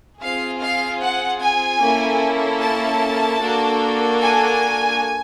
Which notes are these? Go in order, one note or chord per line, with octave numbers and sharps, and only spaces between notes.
C4 F4 G#4 F5
F5
F#5
G#5
A#3 C#4 E4 A4
A5
A#3 D4 F#4 A4
G#5